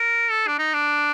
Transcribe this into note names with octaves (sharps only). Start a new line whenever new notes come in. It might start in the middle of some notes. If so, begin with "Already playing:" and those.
Already playing: A#4
A4
D4
D#4
D4